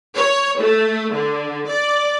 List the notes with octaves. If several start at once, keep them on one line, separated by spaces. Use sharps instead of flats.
C#5
A3
D3
D5